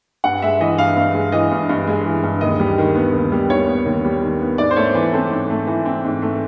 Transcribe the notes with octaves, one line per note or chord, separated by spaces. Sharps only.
G2 F#5
G#3 E5
E3 D#5
G2 F5
G2
G#3
E3 D#5
G2
G2
G#3
E3
G2
D#2 D#5
G3
D#3
B3
D#2
G3
D#3 C#5
B3
D#2
G3
D#3
B3
G#2 D5
C5
A3 C#5
E3 B4
C4 A4
G#2
A3
E3
C4
G#2
A3